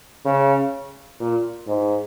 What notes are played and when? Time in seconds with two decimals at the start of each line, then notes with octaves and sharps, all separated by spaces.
0.25 C#3
1.20 A#2
1.67 G#2